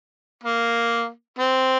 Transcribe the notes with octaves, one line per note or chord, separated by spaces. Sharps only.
A#3
C4